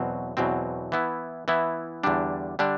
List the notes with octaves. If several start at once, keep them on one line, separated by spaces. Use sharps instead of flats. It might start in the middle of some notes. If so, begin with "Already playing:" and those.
Already playing: E2 B2 F#3 C4
E2 B2 F#3 C4
E3 B3 E4
E3 B3 E4
E2 D3 G3 D4
D3 G3 D4